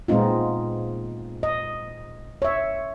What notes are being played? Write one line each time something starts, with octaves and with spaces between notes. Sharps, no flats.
A#2 G#3 B3 C4 D#4 F4
D#5
C#5 E5